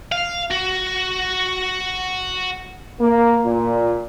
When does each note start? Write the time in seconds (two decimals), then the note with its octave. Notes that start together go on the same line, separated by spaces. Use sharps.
0.12 F5
0.50 F#4
3.01 A#3
3.45 A#2